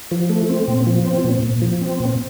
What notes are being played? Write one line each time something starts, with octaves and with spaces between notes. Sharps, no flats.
F3
A3
C4
A#2
F3
C4
A#2
A#2
F3
C4
A#2